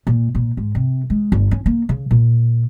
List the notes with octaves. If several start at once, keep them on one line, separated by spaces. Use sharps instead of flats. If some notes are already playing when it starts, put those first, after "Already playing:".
A#2
A#2
G#2
C3
G#3
G1
C#4
A#3
C#3
A#2